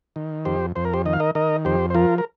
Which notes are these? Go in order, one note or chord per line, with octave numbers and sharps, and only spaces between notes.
D#3
F2 G4 C5
F2 C5
A#4
G4 C5
D#3 D#5
F5
A#4 D#5
D#3 A#4 D#5
F2 G4 C5
C5
F3 F4 A#4
A#4